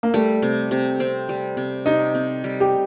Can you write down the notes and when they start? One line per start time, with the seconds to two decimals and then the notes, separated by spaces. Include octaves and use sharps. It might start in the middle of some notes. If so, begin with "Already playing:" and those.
0.03 A#3
0.14 G3 A3
0.42 C3
0.71 C3
1.00 C4
1.29 G3
1.57 C3
1.86 C3 D#4
2.15 C4
2.44 G3
2.60 G4